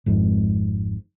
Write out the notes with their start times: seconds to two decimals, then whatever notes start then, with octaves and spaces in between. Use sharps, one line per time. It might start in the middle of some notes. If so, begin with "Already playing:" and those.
0.06 G#1 F2 G#2